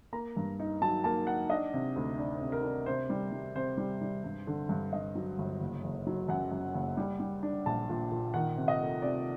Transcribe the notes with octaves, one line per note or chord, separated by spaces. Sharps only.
A#3 A#5
G2
D#4
F#3 A5
A#3 A5
D#4 F#5
D4 D#5
C3
D2
D4
C3
A#4
D4
C3 C5
G3
G3
C3 C5
G3
G3
G2
D3
G2
G2 D#5
F#3
G1
F#1
F#1
F#3
F#2 F#5
F#2
F#1
G3
G3
D4
A#1 A5
A#2
A#2
D#3 F#5
C3
D#5
A3
C3 D5